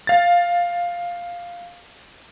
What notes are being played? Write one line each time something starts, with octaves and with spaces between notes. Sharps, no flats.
F5 A6